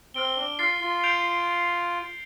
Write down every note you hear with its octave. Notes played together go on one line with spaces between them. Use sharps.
C4 F6 D7 G7
D4
F4 F6 A6 C7
F4
G6 D7 F7